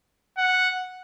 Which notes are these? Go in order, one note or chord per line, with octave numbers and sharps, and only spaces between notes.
F#5